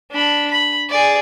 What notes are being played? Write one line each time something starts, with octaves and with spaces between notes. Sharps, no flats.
D4 B5
B5
G#4 D5